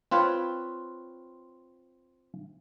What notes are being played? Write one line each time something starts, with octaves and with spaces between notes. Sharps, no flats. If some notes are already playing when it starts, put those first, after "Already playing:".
C4 F4 B4 C#5